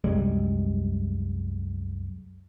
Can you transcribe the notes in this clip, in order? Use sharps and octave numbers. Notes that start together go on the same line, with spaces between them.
C2 F#2 G3 G#3